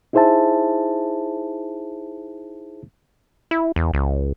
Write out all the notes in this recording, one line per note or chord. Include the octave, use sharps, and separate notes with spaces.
D#4 E4 G#4 C5 E5 A5
E4
E2
C#2